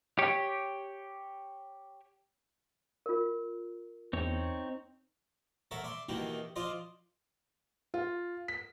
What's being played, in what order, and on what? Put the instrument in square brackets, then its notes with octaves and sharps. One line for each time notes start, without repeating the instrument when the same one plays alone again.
[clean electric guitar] G4 C#5
[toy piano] F4 A#4
[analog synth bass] E2 [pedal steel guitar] C4 D#4 C#5
[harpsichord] A4 A#4 C#5 E5 F#5 A5
D5 E5 C6
B2 D#3 E3 A#3 D#4 G4
F3 F4 C5 D5 D#5
[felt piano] F4
B6